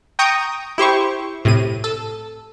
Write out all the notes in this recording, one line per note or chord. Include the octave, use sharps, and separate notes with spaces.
G5 A#5 C#6 D#6
E4 G4 C5 C#6
A2 C3 D#7
A4